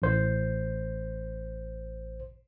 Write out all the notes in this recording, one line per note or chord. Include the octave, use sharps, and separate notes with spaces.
A1 C5